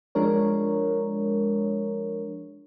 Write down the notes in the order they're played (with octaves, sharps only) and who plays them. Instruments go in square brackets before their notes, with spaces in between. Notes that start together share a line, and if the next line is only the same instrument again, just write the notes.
[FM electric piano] F3 G#3 D4 A#4 C#5